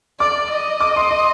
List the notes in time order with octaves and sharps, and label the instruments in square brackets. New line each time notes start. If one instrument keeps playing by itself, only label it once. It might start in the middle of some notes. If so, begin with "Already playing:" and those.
[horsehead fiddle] D5 [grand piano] D6
[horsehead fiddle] D#5
[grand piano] D6
C6
C6